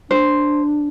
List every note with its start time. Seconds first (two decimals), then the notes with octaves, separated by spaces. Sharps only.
0.10 D4 C5